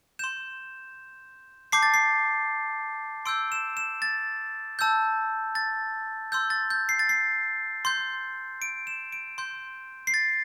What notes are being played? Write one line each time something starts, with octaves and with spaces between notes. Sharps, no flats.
C6 G6 E7
A5 D6 G6 C7
A6
C7
C6 E6 G6 D7
E7
E7
A6
A5 E6 G6
A6
C6 E6 G6
A6
G6
C7
A6
C7
C6 G6
D7
E7
D7
C6 G6
C7
A6